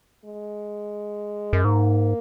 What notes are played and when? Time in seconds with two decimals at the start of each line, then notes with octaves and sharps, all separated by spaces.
0.25 G#3
1.53 F#2
1.65 G#2 A#3